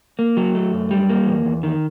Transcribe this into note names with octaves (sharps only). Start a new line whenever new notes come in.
A#3
F#3
A3
F#2
G3
A#3
E2
E2
D#3